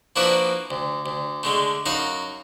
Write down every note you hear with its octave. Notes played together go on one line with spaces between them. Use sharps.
F3 A#3 D4 E4 F#4 B4
D2
D2
D3 G#3 A3
F#2 D#4 F#4 F5